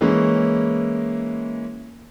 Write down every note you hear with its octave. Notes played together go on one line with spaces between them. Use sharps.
E3 G#3 A#3 C#4 E4